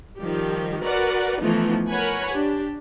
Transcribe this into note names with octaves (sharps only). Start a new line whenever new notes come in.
D#3 F3 G3 G4
F#4 A#4 B4 D5 F#5
E3 F3 A3 B3 D#4
A#4 B4 C#5 F#5 G#5 B5
D4 G4